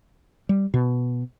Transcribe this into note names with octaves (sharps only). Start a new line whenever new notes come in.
G3
B2